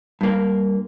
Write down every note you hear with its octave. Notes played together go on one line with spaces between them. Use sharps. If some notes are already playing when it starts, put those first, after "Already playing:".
G2 A#3